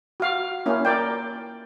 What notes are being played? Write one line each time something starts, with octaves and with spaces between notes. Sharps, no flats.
F#4 F5
A#3 C#4 E4
A#4 D5 G5